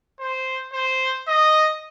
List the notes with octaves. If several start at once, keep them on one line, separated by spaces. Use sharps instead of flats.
C5
C5
D#5